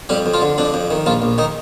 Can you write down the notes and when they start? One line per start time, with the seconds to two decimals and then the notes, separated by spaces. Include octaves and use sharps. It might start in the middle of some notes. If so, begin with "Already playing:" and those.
0.09 F2 G3 G4
0.26 F2
0.34 F3 F4
0.42 D3
0.58 F2 D4
0.74 F2
0.91 D#3
1.06 A#1 F3 F4
1.22 A#1
1.38 D#3 D#4